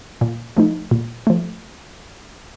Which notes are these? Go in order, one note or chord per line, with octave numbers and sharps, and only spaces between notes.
A#2
F3 A3 D#4
A#2
F3 A3